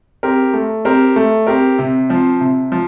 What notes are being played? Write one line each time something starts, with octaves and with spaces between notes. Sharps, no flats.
C4 G4 A#4
A3
C4 G4 A#4
A3
C4 G4 A#4
C3
F3 C4
C3
F3